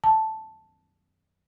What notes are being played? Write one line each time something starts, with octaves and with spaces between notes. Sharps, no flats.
A5